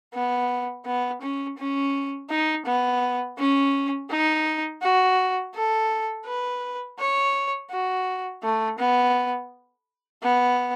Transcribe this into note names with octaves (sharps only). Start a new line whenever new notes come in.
B3
B3
C#4
C#4
D#4
B3
C#4
D#4
F#4
A4
B4
C#5
F#4
A3
B3
B3